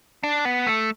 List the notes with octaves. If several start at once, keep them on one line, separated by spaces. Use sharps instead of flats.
D4
B3
A3